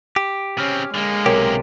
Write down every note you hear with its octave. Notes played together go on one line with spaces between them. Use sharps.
G4
C#3 C4 C#4 F6
D3 G#3 A#3
B1 C3 G4 A#4 C#5